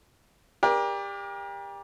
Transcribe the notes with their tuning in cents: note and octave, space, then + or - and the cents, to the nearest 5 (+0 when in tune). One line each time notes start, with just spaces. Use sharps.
G4 +30 A#4 +35 D5 +0